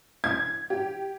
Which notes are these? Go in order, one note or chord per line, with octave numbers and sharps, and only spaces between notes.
G#6
G4